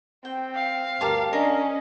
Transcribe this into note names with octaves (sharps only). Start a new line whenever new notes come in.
C4 G5
F5
D2 G2 G4 A#4 A5 D6
C#4 D4 A#4 D#5